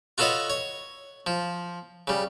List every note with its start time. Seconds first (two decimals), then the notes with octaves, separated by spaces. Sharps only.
0.18 F4 F#4 A4 B4 C#5 D#5
0.50 C#5
1.27 F3
2.07 C#3 G3